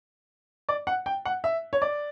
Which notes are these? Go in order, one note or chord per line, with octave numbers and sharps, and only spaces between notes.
D5
F#5
G5
F#5
E5
C#5
D5